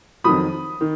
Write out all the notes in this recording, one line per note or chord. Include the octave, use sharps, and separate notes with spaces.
F2 D#3 F#3 B5 D#6
D#3